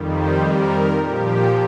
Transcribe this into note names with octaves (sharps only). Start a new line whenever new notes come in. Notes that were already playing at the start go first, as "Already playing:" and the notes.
Already playing: F2 D#3 G3
G4 C5
A#4
A#2 F3 G4